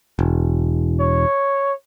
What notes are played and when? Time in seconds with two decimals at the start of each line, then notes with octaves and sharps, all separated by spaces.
0.19 E1
1.00 C#5